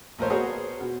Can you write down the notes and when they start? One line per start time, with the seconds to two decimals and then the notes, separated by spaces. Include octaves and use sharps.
0.19 A#1 A3 A#4 C5 C#5
0.30 B3 F#4 G#4 A#4 C5 C#5
0.81 B2